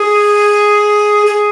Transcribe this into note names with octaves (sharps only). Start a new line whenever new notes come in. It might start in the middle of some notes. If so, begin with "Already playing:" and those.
Already playing: G#4
G#4